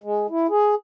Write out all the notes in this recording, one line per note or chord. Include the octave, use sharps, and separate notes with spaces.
G#3
E4
G#4